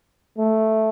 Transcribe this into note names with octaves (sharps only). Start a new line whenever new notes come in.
A3